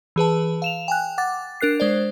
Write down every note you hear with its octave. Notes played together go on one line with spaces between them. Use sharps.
E3 G#4 B4 A5
F5 E7 F7
G5 G#5 F#6
F#5 D6 A6
D4 A#4 F#6 C7
G#3 C5 D5